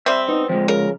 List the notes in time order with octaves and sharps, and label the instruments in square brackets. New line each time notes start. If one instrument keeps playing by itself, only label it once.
[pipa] G3 C4 [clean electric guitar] E5
[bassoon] B3 [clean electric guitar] D#4
[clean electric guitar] F3 G#3 [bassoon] C4
[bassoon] C#3 [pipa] A#4